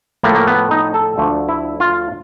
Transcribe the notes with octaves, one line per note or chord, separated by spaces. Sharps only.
A2 F3 A3 A#3
A#3
B3
D#4
A4
D2 D3 F3 A3
E4
F4